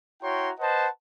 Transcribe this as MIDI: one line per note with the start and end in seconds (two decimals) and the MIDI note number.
0.22 0.50 64
0.22 0.50 66
0.22 0.50 73
0.22 0.50 79
0.22 0.50 82
0.22 0.50 84
0.59 0.88 71
0.59 0.88 72
0.59 0.88 75
0.59 0.88 78
0.59 0.88 81